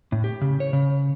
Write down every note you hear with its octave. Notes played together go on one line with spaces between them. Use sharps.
A2
G4
C#3
C#5
C#3